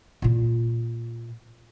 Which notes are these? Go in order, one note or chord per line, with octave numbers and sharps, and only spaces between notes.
A#2 F4